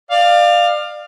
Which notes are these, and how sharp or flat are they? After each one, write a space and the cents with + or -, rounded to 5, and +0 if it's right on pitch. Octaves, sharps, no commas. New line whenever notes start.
D5 +30 F5 +0